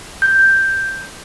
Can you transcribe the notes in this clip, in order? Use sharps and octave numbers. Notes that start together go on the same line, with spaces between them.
G6